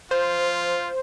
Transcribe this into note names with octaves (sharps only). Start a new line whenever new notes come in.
F4 C5